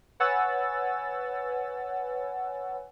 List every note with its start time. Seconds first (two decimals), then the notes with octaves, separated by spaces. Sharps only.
0.20 B4 C#5 F#5 G#5 E6 A6